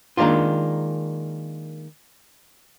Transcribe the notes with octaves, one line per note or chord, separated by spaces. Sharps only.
D#3 G#3 A#3 D4 F4